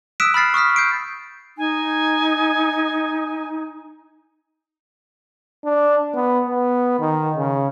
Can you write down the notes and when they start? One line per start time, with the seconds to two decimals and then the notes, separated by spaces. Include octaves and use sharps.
0.20 D#6 E6 F#6 B6 D7 E7
0.34 B5 F6 A6 C7
0.54 C#6 D#6 F6 B6
0.76 G6 C7 D7
1.58 D#4 G#5
5.65 D4
6.15 B3
6.47 B3
7.00 D#3
7.36 C#3